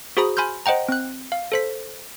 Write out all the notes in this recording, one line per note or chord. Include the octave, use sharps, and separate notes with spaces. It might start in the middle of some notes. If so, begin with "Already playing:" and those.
F#4 G#4 C5 A#5 B5 D#6
G#5 B5 C6 F6 G6
C5 D#5 F#5 G5 A#5
C4 F#6
F5
A4 C5 B6